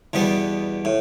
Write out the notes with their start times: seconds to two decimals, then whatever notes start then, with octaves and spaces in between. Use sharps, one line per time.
0.13 E2 B2 G3 B3
0.85 A2